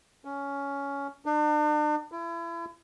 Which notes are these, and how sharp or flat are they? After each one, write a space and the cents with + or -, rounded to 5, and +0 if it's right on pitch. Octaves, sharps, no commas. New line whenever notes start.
C#4 +15
D4 +40
E4 +35